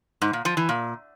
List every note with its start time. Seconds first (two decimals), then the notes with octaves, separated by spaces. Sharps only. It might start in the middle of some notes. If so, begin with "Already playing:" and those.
0.22 G#2
0.33 A#2
0.45 F3
0.57 E3
0.69 A#2